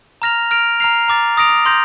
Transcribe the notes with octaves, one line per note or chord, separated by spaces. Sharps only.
A#5 F6 A#6 F7
F6 A#6 D7 F7
A#5 F6 C7 F7
A#5 D6 A6
D#6 A#6 D7 F7
C6 G6 A#6 F7